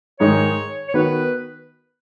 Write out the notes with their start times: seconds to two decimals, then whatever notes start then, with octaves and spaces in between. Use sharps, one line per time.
0.20 G#2 D#3 G#3 D#4 C#5
0.88 C#5
0.94 D#3 B3 F#4 B4